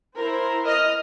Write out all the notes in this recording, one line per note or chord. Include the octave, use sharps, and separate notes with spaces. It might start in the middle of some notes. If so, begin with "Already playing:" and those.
E4 A#4 C5
D#5 F6